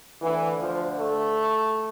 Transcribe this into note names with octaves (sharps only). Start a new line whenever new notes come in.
D2 D3 E3
F3
A3